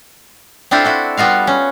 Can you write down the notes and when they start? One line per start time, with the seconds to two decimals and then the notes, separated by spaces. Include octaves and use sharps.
0.71 C4 D4 E4 F4 A4 C5
0.85 E4 F#4 A4
1.17 G3 B3 F4 F#4 F5
1.47 C#4